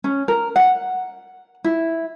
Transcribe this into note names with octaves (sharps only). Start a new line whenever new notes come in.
C#4
A#4
F#5
E4